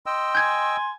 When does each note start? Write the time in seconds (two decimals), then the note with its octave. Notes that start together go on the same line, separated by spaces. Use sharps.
0.06 D#5 G5 C6 E6
0.35 G#5 G6 G#6